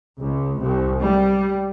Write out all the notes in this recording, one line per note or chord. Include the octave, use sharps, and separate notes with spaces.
C#2
C2
G3